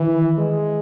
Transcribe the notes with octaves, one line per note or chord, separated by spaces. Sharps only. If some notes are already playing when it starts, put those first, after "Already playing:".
Already playing: D#3 E3
G#3